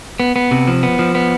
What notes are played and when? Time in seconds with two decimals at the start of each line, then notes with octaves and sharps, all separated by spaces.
0.20 B3
0.36 B3
0.51 C3
0.68 F3
0.83 B3
0.99 F3
1.15 B3